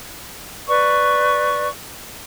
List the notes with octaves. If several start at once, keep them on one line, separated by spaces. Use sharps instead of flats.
B4 D5 C#6